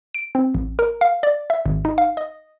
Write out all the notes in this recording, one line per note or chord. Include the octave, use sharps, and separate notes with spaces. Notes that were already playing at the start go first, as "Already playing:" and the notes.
D7
C4
A1
A#4
F5
D5
E5
G#1
D#4
F5
D#5